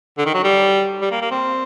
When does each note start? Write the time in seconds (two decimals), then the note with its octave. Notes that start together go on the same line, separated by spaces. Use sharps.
0.18 D3
0.26 D#3
0.34 F#3
0.43 G3
1.02 G3
1.11 A#3
1.21 A#3
1.31 C4